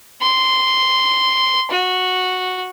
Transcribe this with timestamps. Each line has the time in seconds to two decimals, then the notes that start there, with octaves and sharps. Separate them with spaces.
0.22 C6
1.71 F#4